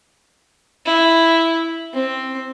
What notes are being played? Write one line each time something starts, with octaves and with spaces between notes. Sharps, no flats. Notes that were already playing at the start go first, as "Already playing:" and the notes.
E4
C4